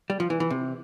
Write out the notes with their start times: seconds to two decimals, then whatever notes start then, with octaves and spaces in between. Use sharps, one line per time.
0.10 G3
0.20 F3
0.30 E3
0.40 E3
0.50 C3